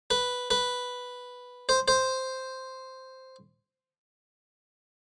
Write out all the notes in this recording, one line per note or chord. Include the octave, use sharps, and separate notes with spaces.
B4
B4
C5
C5